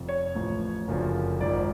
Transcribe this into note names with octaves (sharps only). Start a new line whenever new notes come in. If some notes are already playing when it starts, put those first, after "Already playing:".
Already playing: F1 F2 F3
C#5
A1 A2 F3
F#1 F#2 D3 F3
G#1 G#2 F3 D5